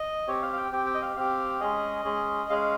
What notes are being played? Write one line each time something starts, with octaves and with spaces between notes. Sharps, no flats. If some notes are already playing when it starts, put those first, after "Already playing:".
Already playing: D#5
C4 G4 C#5
F5
F5
G5
C4 G4 G5
G5
D#5
F5
C4 G4 F5
G#3 C#4 G#4 D#5
G#3 C#4 G#4
G#3 C#4 G#4 F5